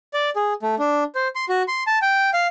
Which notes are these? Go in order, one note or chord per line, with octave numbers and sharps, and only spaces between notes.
D5
G#4
A3
D4
C5
C6
F#4
C6
A5
G5
F5